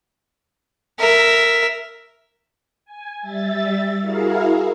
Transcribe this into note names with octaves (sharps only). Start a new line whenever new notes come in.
A#4 E5
G#5
G3 E5 A6
E4 F#4 G#4 A#4 F5